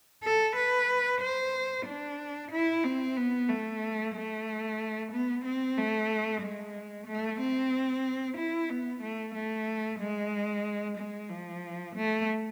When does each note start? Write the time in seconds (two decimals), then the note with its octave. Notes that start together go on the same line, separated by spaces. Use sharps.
0.23 A4
0.56 B4
1.21 C5
1.86 D4
2.51 E4
2.84 C4
3.17 B3
3.49 A3
4.15 A3
5.12 B3
5.45 C4
5.77 A3
6.41 G#3
7.07 A3
7.40 C4
8.37 E4
8.70 B3
9.02 A3
9.34 A3
10.00 G#3
10.97 G#3
11.30 F3
11.95 A3